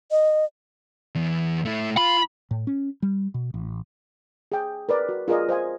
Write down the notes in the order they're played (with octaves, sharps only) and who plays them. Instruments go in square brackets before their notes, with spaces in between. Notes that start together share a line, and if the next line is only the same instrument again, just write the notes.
[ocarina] D#5
[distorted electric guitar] E2
A3 E4
[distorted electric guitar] F4 [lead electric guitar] B5
[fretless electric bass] A2
C#4
G3
B2
A1
[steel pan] G#4 G5
A#4 B4 D5
F#4
F4 G#4 A#4 D5 D#5
C5 D#5 F5 G#5